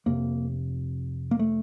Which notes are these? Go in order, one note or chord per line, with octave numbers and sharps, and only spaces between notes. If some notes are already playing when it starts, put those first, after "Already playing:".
F2 C3 A#3
A#3
A3